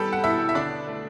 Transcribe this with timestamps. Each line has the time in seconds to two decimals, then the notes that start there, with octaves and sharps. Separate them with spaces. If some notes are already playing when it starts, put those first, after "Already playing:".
Already playing: G3 B3 G4 A4 A5 B5
0.13 F#5
0.24 B2 E4 E5
0.49 E5
0.55 D3 D4 D5
0.87 A3